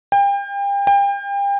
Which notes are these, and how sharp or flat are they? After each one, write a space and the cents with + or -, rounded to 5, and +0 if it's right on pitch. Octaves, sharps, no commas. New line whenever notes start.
G5 +35
G5 +35